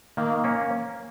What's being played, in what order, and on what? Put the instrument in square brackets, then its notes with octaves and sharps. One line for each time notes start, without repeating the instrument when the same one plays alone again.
[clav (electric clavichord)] D#3 [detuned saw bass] A#3
[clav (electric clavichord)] A#3 C#4